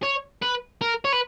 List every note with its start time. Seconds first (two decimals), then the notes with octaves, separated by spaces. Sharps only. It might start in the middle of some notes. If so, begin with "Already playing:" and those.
0.03 C#5
0.42 B4
0.81 A#4
1.04 C#5
1.12 B4